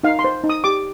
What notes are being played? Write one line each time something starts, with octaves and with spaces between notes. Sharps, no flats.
D#4 F5
C6
C5
D#4
D#6
G4 D6